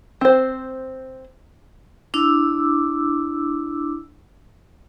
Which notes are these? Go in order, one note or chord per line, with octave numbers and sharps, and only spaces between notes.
C4 C5
D4 E4 D6 E6